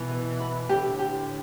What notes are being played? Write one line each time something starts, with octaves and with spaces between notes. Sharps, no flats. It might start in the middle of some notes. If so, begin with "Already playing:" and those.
Already playing: B2 E3
B4
B5
A2 D3 G4
G4